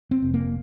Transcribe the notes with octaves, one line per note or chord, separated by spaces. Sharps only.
C4
F1
A#3